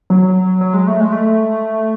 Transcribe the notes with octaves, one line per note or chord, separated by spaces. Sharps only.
F#3
F#3
G#3
A3
G#3
A3